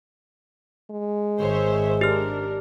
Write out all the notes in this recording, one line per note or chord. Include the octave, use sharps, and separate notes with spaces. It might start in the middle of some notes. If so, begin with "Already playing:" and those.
G#3
G#1 C5 C#5 E5
D4 G4 A#4 F6